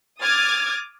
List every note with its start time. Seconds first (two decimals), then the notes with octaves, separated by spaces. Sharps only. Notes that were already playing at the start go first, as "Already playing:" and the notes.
0.22 D6 D#6 F6 G#6 A6